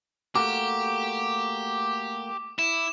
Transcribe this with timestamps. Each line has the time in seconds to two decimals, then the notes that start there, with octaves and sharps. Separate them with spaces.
0.35 A3 A#3 F#4 G4 D6
2.59 E4 E7